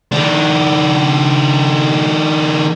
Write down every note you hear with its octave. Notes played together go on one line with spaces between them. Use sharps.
D#3 D4